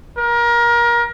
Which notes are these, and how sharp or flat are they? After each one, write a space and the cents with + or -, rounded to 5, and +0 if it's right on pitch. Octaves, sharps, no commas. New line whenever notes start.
A#4 +25